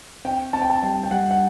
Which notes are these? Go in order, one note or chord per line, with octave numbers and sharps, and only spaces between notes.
C4 G5
C4 A5
G5
A5
G3 G5
G5
G3 F#5
F#5